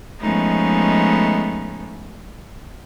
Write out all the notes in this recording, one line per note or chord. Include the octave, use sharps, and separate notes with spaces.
F3 G#3 A3 B3 C#4 D#4